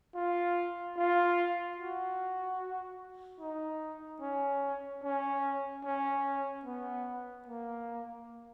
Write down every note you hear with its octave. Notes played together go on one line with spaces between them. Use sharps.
F4
F4
F#4
D#4
C#4
C#4
C#4
B3
A#3